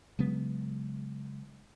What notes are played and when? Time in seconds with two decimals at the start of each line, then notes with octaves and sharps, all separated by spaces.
0.19 C#3 F#3 G#3 B3